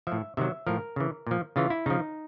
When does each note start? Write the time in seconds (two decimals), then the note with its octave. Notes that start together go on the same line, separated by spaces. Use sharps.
0.07 A2 F3 E5
0.37 C3 D#3 F#3 E5
0.67 A2 F3 A#4
0.96 C#3 E3
1.27 A#2 F3
1.56 C#3 E3 F4
1.70 E4
1.86 C#3 F3 D#4